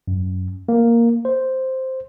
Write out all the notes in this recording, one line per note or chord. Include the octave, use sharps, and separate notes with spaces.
F#2
A#3
C5